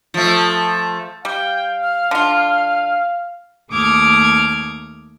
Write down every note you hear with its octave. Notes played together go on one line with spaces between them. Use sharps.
F3 A3
G3 F5 G5
F6
D3 F4
D#2 A3 D6 D#6 F6 G#6